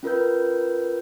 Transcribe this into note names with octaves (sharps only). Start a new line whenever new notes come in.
C#4 F4 A#4 B4 G6